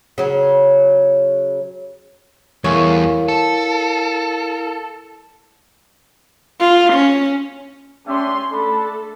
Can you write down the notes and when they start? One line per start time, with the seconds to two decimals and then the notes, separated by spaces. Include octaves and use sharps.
0.18 C#3 F#3
2.64 E2 G3 A3 E4 G#4 A#4 C#5 F5
3.28 A4 A5
6.60 F4
6.93 C#4
8.07 C#4 D4 G4 E5 C6
8.52 A3 D4 A4 B5